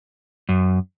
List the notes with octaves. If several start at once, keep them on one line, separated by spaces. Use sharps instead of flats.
F#2